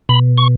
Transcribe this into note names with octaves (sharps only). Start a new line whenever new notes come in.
B2 B5
C#6